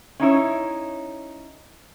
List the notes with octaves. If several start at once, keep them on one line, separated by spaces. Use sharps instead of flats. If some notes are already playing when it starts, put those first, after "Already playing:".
C#4 D#4 E4 C#5